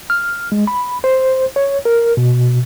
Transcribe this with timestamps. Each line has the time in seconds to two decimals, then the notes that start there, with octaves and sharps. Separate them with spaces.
0.10 F6
0.52 G#3
0.67 B5
1.04 C5
1.56 C#5
1.85 A#4
2.17 B2